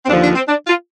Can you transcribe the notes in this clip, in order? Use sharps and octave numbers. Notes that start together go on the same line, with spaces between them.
C4
D#2 D3 F3 D4
D4
C4
D4
F4